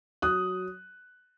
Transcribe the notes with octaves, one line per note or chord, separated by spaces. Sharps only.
F#3 D#6 F#6